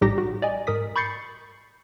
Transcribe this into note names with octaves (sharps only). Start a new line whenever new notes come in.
A#1 A2 G3 D#4 G4 A#6
F#4
D5 D#5 G#5
G#2 A#4 D#6 B6
B5 C#6 G6 A6 C7 C#7